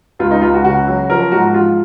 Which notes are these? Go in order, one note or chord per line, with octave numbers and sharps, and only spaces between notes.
C#2 F4
D#4
C#2 F4
F#4
C#3 F#4
F#3
F3 A#4
G#2 F#4
F3 F4